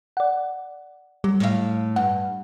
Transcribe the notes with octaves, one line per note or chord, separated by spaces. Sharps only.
D5 F#5
F#3 G3
A2 F5
G2 F#5